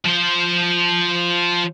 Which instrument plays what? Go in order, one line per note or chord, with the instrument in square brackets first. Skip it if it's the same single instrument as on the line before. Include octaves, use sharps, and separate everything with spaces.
[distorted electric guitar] F3 C5